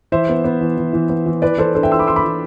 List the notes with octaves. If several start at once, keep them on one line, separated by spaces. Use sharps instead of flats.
E3 C5 E5
B3
B3
E3
E3
E3
B3
E3
E3 B4 D5
E3 A4 C5
D4 A4 C5
E5 G5
E3 C6 E6
B5 D6
E3 C6 E6
B5 D6
E3